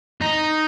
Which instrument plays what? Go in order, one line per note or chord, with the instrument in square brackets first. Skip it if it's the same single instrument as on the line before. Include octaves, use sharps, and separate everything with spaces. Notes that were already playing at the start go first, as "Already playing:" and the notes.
[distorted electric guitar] D#4